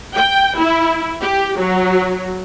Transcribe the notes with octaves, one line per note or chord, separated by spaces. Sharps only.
G5
E4
G4
F#3